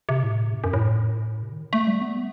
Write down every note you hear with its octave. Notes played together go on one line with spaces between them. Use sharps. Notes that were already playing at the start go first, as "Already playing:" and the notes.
C3
A2
F#2
F#2
A2
C3
D#3
A3
G3
B3
A3